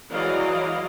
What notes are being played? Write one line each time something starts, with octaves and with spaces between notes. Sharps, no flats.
E3 F#3 G#3 D5 D#5 F5